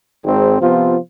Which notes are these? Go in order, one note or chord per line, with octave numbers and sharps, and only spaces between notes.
G#1 G#2 G#3 C4
C3 F3 B3 F4